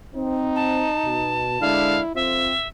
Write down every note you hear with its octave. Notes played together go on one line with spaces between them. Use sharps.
C4 D#4
A5
B2
D3 G#3 D4 E4 F5
F2 C4 F4 E5